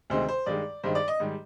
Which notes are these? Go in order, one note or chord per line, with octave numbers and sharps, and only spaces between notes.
D2 C3 D#3 G#3 C5
C5
G2 D#3 G#3 D5
G2 D#3 G#3 C5
D5
D#5
G#2 D#3 G3